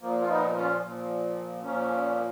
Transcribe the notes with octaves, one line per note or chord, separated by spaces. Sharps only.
A#2 F3 A#3
F4
B3 D#4
C#4 F4
A#2 F3
A#2 F3 A#3 C#4